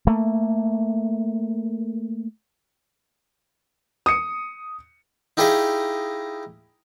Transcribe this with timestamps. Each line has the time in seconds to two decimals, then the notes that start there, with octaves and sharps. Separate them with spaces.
0.07 A3 A#3
4.06 D#6 C#7
5.37 D#4 E4 G4 G#4 D#5 F5